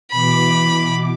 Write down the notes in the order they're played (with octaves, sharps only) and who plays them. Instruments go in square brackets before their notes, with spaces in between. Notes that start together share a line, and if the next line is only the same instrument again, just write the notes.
[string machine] B2 E3 D6 [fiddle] B5